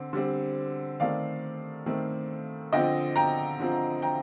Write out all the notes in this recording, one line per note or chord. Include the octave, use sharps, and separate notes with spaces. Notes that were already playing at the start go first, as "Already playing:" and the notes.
Already playing: D3 C4
D3 G3 C4
D#3 A3 C4 D5 F5
D#3 A3 C4
D3 F3 C4 D#5 G5
G5 A#5
D3 F3 C4
G5 A#5